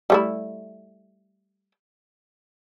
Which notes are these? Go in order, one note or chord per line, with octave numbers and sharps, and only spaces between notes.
G3 A3 E4